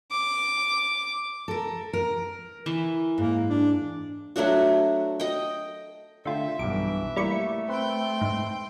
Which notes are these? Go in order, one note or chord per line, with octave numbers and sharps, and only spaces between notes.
D6
A4 A#4
A#4
E3
G#2 A#3
D4
F#3 A3 D4 F#4
D#5 G5
D3 A3 F4 E5 G5
B1 G2 E3 D6
G3 A3 A#3 E4 C#6
C4 B4 G5 C6
G#2